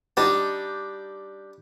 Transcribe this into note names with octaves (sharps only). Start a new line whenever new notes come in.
G3 D4 D#4 G4